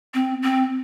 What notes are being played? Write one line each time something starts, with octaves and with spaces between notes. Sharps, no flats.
C4
C4